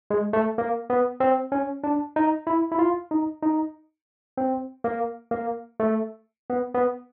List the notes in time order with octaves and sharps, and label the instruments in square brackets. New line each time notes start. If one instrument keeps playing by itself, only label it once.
[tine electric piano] G#3
A3
A#3
B3
C4
C#4
D4
D#4
E4
E4
F4
D#4
D#4
C4
A#3
A#3
A3
B3
B3